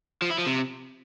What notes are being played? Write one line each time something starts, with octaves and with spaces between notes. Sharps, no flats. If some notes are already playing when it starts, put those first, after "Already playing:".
F3
E4
F3
C3